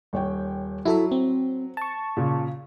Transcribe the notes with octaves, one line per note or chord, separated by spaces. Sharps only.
D#1 C#5 G5
F#3 E4 A4 E5
C4
A5 C#6
A#2 C#3